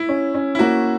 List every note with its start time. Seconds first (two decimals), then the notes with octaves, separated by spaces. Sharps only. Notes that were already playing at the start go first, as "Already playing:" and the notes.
Already playing: E4
0.09 C#4
0.35 C#4
0.55 E4
0.59 A#3 F#4